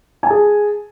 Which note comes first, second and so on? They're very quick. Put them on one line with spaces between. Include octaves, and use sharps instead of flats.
G#5 A5 G#4